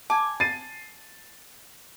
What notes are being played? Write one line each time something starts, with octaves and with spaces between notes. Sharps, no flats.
G#5 A5 D6
A6 C7 D#7